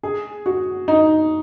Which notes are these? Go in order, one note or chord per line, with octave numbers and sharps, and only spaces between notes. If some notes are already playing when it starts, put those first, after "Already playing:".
G#4
F#4
D#4